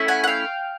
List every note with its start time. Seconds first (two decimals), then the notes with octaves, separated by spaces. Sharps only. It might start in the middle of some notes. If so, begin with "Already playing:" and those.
Already playing: A3 C#4 E4
0.08 F#5 G#5
0.24 F#5
0.27 F5 G5